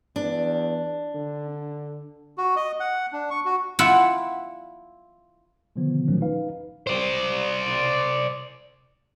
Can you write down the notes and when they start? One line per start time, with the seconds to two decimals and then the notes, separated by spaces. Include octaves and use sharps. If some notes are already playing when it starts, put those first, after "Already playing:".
0.16 E2 D4
1.15 D3
2.38 F#4
2.56 D#5
2.80 F#5
3.13 D4
3.30 C#6
3.45 F#4
3.79 E4 F4 F#5 G5 B5
5.76 B2 D3 D#3 F3 B3
6.08 A#2 D#3 F3 F#3 A3 C#4
6.21 D#4 B4 F5
6.87 C5 D5